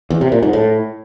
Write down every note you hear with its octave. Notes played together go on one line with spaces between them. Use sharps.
E2
C3
A#2
G#2
A2